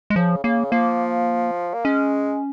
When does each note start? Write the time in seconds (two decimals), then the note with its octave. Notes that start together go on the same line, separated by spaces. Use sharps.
0.10 G#3
0.15 C#3 F3
0.43 C#3 A#3
0.72 F3 A#3
1.74 A#3
1.85 G#3 C#4